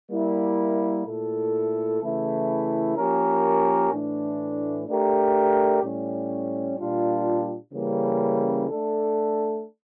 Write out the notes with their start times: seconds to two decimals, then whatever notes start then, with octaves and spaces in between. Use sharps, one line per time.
0.11 G3 A#3 E4 A#4
1.06 A#2 A3 E4 A4
2.01 C#3 E3 A3 E4
2.97 F3 A#3 C#4 G4 A#4
3.92 A2 E3 A3 D4
4.88 A3 D4 G4 A#4
5.83 A2 G3 C#4
6.79 A#2 G3 D4 F4
7.73 C#3 E3 G3 A#3 C#4
8.69 A3 D4 A4